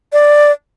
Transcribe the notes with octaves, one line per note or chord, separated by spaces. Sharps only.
D5